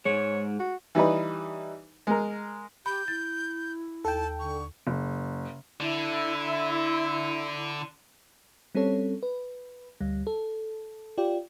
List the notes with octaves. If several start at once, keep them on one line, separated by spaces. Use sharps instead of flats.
G#2 G#3 C#5
F#4
E3 G3 D#4 B4
G#3 A#4
G4 B5 G6
E4 A6
D#2 A4 G5 A5
D3 C#6
F#1
D3 E4
G3 C4 C#4 A4 C#5
B4
D2 G3
A4
F4 G4 D5 G5